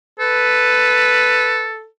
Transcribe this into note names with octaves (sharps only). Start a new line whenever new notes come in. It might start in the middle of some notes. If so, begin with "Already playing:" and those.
A4 B4